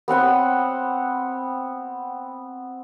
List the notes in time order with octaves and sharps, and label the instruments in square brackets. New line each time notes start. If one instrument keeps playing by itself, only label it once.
[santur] B3 C4 F#5 G5